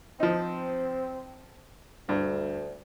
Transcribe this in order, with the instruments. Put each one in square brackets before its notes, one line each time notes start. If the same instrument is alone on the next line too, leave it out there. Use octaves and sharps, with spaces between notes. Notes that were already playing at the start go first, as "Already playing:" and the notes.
[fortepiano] F3 D#4 [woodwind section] C4
[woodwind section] D2 [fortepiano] G2